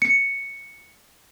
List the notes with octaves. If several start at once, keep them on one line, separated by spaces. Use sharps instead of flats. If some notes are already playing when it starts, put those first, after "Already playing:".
C#7